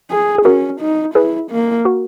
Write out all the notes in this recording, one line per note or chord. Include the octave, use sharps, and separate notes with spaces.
G#4
G#4
C#4 F#4 A#4
D#4
E4 G#4 B4
A#3
F#4 A#4